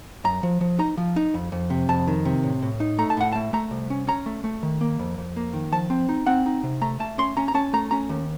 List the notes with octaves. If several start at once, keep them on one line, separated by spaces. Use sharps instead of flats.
F#2 A#5
F3
F3
D#4 A#5
F3
D#4
F2
F2
C3
F2 A5
D#3
C3
A2
A2
D#4
A3 A#5
A5
A2 F#5
A3 A5
A3 A#5
C2
C#4
C#4 A#5
A3
A3
D#3
A#3
F2
F2
A#3
D#3
F3 A5
C4
D#4
C4 F#5
D#4
C3
A3 A#5
A3 A5
C#4 C6
C#4 A#5
A#5
C#4 A5
A3 A#5
C#4 A#5
D#2